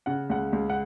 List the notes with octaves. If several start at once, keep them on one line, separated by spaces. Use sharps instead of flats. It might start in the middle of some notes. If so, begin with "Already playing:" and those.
C#3 F#5
C#2 F#5
C#2
F#5